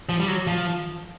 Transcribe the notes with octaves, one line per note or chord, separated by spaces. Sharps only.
F3
G3
F#3
F3